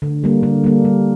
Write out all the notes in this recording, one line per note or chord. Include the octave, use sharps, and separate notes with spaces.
D3
G3 A#3
D3
G3 A#3
G3